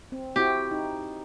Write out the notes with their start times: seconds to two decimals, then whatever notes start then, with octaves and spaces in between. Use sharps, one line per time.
0.12 C4
0.36 C4 E4 F#4 G4
0.71 D#4